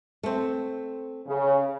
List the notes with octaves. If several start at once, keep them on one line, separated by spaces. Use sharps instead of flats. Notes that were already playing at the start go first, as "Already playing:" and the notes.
A3 C4
C#3